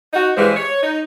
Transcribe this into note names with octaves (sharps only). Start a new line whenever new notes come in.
D#4 F#4
G2 E3 G#3 C5
C#5
D#4